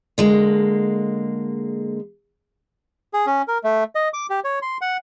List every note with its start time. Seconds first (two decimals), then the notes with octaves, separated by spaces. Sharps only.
0.18 D3 G#3 A#3
3.14 G#4
3.26 C#4
3.48 A#4
3.64 A3
3.95 D#5
4.13 D6
4.30 G4
4.44 C#5
4.62 C6
4.81 F#5